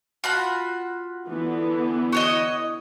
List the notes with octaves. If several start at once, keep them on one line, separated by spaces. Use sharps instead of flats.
F4 F#4 B5
D3 E3 B3
F#4 C#5 D#5